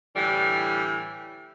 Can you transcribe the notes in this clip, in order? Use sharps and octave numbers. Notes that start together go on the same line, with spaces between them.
A2 D3 E3 G3